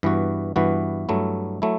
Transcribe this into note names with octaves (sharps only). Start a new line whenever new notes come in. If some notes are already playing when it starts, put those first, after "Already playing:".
G2 E3 B3 F#4
G2 E3 B3 F#4
G2 F#3 A3 E4
F#3 A3 E4